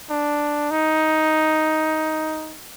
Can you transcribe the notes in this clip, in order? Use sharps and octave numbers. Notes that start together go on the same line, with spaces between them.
D4
D#4